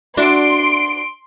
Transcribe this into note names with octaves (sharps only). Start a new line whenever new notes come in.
D4 F#4 E5 C6 D7